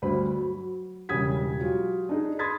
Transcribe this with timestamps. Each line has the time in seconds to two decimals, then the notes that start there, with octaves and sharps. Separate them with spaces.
0.02 D2 G2 C5 B5
0.37 F#3
1.09 E1 C#3 G3 D#6 G#6 B6
1.61 F#3 F4 G4
2.09 D4 D#4 G#4
2.39 B5 C6 D#6 G#6 A6 B6